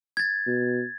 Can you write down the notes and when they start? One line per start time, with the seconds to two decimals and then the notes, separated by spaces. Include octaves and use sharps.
0.17 G#6 A6
0.46 B2